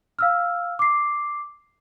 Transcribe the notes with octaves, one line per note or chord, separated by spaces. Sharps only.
F5 E6 F6
D6 C7